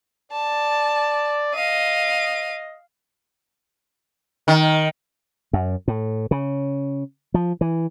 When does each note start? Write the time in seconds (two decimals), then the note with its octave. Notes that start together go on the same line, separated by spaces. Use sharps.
0.32 D5 A5
1.55 D#5 F5 D#7
4.48 D#3
5.53 F#2
5.88 A2
6.31 C#3
7.34 F3
7.61 E3